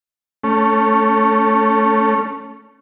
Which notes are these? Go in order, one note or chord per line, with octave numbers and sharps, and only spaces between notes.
A3 C#4